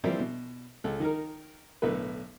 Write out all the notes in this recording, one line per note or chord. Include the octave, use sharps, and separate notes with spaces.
E3 F3 G3 A#3 C4 E4
B2
C#2 A4
D#3 D#4 A#4
B1 A2 D3 B4